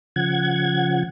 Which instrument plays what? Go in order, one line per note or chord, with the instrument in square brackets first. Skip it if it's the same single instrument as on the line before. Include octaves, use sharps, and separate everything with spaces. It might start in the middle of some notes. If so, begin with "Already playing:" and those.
[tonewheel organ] C#3 F3 F#5 G#6